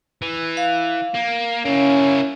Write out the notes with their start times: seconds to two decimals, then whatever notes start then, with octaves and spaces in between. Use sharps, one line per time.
0.22 E3
0.57 F5
1.14 A#3
1.65 A#3 C#4 E4